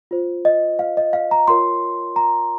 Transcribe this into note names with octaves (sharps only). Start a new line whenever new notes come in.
F4 C5
D#5
F5
D#5
F5
A#5
F4 A#4 C#5 C6
A#5